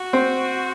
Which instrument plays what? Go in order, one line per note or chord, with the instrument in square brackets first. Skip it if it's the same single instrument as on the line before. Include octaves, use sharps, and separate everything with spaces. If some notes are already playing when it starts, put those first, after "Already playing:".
Already playing: [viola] F#4
[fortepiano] C4